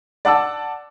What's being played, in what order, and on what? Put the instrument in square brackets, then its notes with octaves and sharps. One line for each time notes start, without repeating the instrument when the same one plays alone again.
[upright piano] D5 F#5 A5 E6